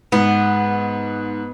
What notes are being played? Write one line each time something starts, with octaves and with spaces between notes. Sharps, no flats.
G#2 B3